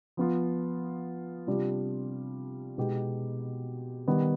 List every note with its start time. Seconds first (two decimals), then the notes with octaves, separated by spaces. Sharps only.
0.17 F3 B3 F4
1.47 C3 G3 D4 F4
2.78 B2 G#3 B3 D#4 G4
4.08 D#3 G3 B3